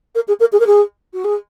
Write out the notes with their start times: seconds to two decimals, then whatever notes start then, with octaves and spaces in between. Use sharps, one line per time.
0.15 A#4
0.27 G#4
0.39 A#4
0.52 G#4
0.59 A#4
0.66 G#4
1.13 F#4
1.24 G#4